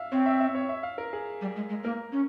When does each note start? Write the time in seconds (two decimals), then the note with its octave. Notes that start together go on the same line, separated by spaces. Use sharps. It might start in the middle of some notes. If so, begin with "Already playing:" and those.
Already playing: E5 F5
0.12 C4 C#5
0.26 E5
0.40 E5
0.55 C#5
0.69 E5
0.83 F5
0.98 A#4
1.13 G#4
1.41 G3
1.56 G#3
1.69 G#3
1.84 A#3 A#4
2.12 C#4